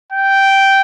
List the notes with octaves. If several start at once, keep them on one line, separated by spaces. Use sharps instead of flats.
G5